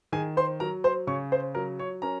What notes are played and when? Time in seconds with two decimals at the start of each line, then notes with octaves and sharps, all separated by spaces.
0.12 D#3 G#4 G#5
0.37 C5 C6
0.60 F#3 A#4 A#5
0.84 C5 C6
1.07 C#3 C#5 C#6
1.32 C5 C6
1.55 F#3 A#4 A#5
1.79 C#5 C#6
2.02 C#4 A#4 A#5